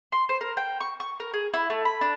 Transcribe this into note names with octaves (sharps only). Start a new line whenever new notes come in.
C6
C5
A#4
G5
C#6
C#6
A#4
G#4
E4
A3
B5
D4